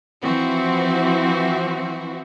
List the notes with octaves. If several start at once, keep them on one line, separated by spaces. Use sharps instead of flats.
E3 F3 C4 F#4